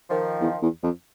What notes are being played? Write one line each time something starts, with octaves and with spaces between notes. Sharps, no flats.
D#3 F3
E2
E2
F2